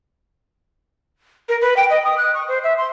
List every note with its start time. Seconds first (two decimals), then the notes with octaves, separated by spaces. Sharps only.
1.49 A#4
1.62 B4
1.77 G5
1.90 D#5
2.04 D#6
2.18 F#6
2.34 C#6
2.48 C5
2.64 E5
2.78 C6